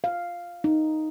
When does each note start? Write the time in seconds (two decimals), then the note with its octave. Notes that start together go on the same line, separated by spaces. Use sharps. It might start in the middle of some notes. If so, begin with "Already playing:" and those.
0.04 F5
0.64 D#4